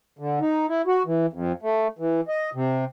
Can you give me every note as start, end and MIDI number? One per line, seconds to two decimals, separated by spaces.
0.19 0.39 50
0.41 0.66 63
0.69 0.82 64
0.87 1.02 66
1.06 1.26 52
1.33 1.52 41
1.62 1.88 57
1.99 2.21 52
2.28 2.50 75
2.55 2.85 48